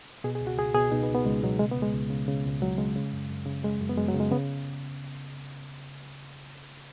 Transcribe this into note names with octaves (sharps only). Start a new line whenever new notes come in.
B2 G#4
G#4
C#2
F#4
C#2 G#4
B2 G#4
B2 D#4
B3
C#2
B3
C#2 G#3
B2 F#3
C#3 G#3
B3
C#2
G#3
C#2
C#3
C#3
C#2
C#2 F#3
C#3 G#3
C#3
F#2
F#2
C#3
C#3 G#3
F#2
B3
F#2 G#3
F#3
C#3
G#3
C#3 B3